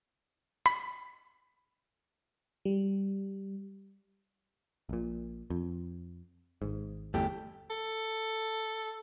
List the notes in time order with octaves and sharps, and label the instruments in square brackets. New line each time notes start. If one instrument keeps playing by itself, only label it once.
[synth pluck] B5
[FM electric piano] G3
[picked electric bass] A#1 A#2
F2
G#1 G#2
[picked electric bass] G1 E2 [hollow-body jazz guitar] A3 G4
[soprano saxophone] A4